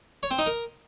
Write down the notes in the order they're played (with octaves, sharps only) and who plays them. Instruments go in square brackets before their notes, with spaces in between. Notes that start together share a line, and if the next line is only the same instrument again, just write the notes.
[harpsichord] C#5
C4
D#4
A#4